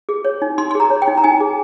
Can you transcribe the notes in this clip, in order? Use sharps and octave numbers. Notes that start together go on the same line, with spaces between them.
G#4
C#5
D#4
D#4 C6
C6
G#4 A#5
C#5
G5
D#4
A#5
D#4 G#5
G#4